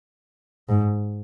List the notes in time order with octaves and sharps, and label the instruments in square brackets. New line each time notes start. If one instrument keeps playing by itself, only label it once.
[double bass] G#2